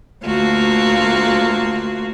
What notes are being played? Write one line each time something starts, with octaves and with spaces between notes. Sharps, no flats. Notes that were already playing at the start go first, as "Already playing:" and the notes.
D2 A3 A#3 F4 F#4 F5